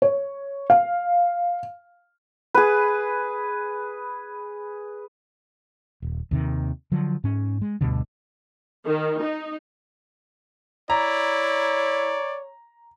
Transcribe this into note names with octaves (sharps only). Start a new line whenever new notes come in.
C#5
F5
G#4 B4
D#1
D#2 C3 D#3
D3 F3 F#3
G#2 C#4
G#3
D2 G2 B2 D3
D#3
D#4
E4 C#5 D5 A#5